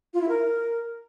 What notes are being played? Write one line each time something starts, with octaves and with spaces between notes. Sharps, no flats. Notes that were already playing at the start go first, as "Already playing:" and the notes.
F4
E4
A#4